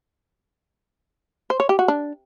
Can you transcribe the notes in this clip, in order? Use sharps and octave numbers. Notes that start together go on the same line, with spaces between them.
C5
C#5
G4
F#4
D4